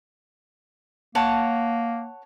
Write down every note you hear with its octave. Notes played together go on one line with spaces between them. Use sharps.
A#3 C#5 F#5 A5